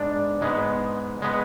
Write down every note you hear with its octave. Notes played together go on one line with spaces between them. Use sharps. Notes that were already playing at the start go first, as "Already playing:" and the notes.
Already playing: G#2 G#3 B3 D4
G#2 G#3 B3
G#3 B3